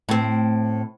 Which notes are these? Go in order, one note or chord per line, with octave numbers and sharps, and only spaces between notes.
A2 C4